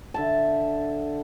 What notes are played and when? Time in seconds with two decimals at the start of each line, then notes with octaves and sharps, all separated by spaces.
0.14 D3 E5 A5